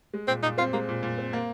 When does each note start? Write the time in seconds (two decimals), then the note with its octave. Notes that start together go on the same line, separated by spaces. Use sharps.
0.13 G#3
0.28 A#2 C4
0.43 A#2 D#4
0.58 C4 F4
0.73 G#3 A#3
0.88 A#2
1.03 A#2
1.18 C4
1.33 A#3